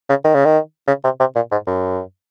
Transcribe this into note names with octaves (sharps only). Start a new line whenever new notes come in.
C#3
D#3
C#3
D#3
C#3
C3
C3
A#2
G#2
F#2